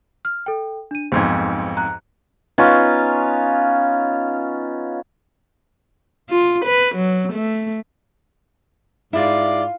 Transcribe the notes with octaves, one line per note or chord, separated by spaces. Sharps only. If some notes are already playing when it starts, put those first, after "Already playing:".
F6
A4 G5
D4 D#7
B1 F2 G#2 C5 C6 G#6
A#5 F#6
B3 C#4 D#4 F4
F4
B4
F#3
A3
G#2 E4 F4 D5